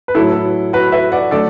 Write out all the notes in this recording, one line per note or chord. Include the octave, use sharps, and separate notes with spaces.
B4
A2 F#3 A3 E4 A4
F#4 B4
B4 E5
D5 F#5
D3 F#3 A3 A4 D5